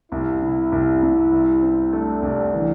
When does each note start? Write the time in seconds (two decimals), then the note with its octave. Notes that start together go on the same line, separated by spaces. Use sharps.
0.11 C2 E4
0.41 C3 E4
0.72 C2
1.03 C2
1.32 C2
1.63 C4
1.92 A3 D4
2.22 C2
2.54 E3